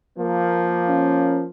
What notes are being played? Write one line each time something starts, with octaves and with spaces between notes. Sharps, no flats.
F3 A#3
C#4